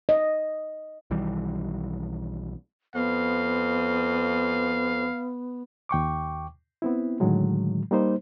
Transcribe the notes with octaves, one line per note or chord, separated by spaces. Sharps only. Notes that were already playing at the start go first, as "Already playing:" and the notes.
D#5
B1 D#3 E3 G3
F2 B3 F5
D#2 G5 C#6 D6
B3 C4 E4
A2 D3 D#3 F#3 G#3
G3 A#3 D#4 C5